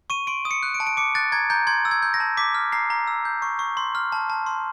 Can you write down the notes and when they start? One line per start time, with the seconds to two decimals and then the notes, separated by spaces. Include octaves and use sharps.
0.10 C#6 D#7
0.27 C6 D7
0.45 D#6
0.51 C#7
0.63 F#6
0.75 D7
0.80 A5
0.87 D7
0.97 D6 C#7
1.15 F#6 A6
1.32 A#5 G#6
1.50 A#5 G6
1.67 C6 G#6
1.85 E6
1.91 G#6
2.02 G6
2.14 A#6
2.20 A5
2.37 D6 B6
2.55 F6
2.72 A#5 C7
2.90 A#5
3.07 E6
3.25 G6
3.42 C#6
3.59 C#6
3.77 C6
3.95 F6
4.12 A5
4.30 A5
4.46 C6